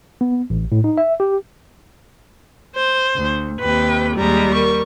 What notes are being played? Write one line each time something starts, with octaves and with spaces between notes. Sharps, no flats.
B3
A1
A2
D#4
E5
G4
C5
D2
D#2 C3 B4 G5
D#2 G3 G#3 A#5
A#4 C#6